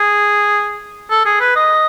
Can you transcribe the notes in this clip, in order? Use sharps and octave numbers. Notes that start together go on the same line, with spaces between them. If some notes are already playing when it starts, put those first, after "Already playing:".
Already playing: G#4
A4
G#4
B4
D#5